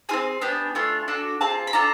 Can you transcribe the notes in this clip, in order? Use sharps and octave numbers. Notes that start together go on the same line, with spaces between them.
C4 F4 G#4 G#5
B3 D4 G4
A3 D4 F4
D4 F#4 A4
C4 F4 G#4 A5
B5
D4 F4 A4 A#5